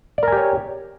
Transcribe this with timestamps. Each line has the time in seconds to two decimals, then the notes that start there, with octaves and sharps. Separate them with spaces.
0.18 D5
0.23 A#4
0.28 G#5
0.32 G4
0.37 C#5